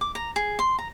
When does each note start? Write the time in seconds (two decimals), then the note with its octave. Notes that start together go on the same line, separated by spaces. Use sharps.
0.01 D6
0.15 A#5
0.36 G#4
0.59 C6
0.79 A#5